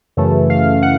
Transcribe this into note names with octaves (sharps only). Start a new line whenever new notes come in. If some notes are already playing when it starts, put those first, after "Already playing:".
F#2 C#3 E3 A3
F5
F#5